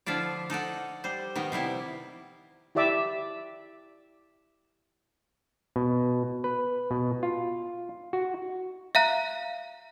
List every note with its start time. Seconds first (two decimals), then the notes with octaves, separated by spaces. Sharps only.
0.06 D3 F3 E4 F4 D5
0.50 D#4 A4 D5 F#5
1.04 G3 C5
1.36 D#3 B3 A#5
1.52 C3 G3 B3 E4
2.75 E4 G4 D5 E5 D6
5.76 B2
6.44 B4
6.91 B2
7.23 F4
8.13 F#4
8.95 E5 F5 A#5 F#6